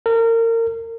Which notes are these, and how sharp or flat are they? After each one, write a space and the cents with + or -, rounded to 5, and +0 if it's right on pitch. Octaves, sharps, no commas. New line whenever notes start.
A#4 -30